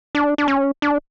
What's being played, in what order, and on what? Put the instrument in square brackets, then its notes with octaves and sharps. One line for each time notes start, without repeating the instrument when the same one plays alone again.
[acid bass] D4
D4
C#4
D4